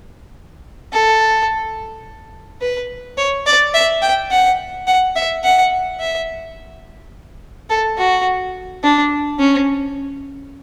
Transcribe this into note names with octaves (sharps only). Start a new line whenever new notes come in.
A4
B4
C#5
D5
E5
G5
F#5
F#5
E5
F#5
E5
A4
F#4
D4
C#4